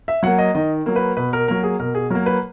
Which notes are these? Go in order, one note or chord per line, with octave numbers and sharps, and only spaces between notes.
E5
F#3 A#3 F#5
D#5
D#3 D#5
F#3 A#3
B4
B2 B4
A#4
F#3 A#3 A#4
G#4
B2 A#4
G#4
F#3 A#3 A#4
B4